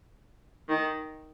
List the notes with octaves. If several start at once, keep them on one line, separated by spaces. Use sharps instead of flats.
D#3